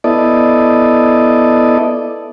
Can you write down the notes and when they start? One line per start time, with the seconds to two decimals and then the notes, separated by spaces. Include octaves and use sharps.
0.04 B3 E4 A4 D5 D#5